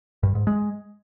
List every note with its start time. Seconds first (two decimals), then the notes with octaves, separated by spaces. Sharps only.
0.23 G2
0.35 G#2
0.47 G#3